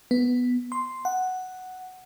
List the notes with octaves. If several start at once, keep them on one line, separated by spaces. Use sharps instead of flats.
B3
C6
F#5